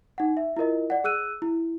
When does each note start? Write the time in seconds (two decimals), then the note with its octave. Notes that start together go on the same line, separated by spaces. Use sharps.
0.18 D#4 F#5
0.37 E5
0.57 E4 F4 A#4 D#5
0.90 D5 F#5
1.04 G#4 E6 F#6 D#7
1.42 E4